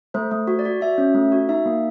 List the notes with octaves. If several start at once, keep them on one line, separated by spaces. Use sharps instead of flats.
A3 C5
A3
F#4
D5
F#4
F#4 E5
C#4
A3
F#4
D#4 E5
A#3